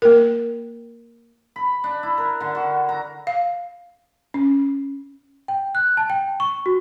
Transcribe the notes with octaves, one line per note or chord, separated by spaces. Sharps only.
A#3 A#4
B5
D4
E4
A#4
D3
F#4
A#5
F5
C#4
G5
F#6
A5
G5
C#6
F#4